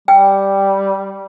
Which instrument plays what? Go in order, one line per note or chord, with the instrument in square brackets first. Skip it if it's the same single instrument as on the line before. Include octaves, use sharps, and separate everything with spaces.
[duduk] G3 [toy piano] G5